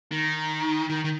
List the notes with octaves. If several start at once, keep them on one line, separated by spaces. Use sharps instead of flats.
D#3
D#3
D#3